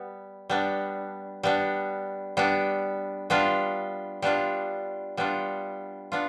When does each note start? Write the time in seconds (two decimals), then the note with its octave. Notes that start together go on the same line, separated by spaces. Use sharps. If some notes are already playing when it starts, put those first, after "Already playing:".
Already playing: G3 B3
0.50 G3 B3 D4
1.43 G3 B3 D4
2.37 G3 B3 D4
3.30 G3 B3 D4 F4
4.22 G3 B3 D4 F4
5.17 G3 B3 D4 F4
6.12 B3 D4 F4